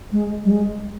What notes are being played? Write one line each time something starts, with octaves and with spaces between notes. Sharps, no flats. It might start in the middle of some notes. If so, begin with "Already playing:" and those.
G#3
G3
G#3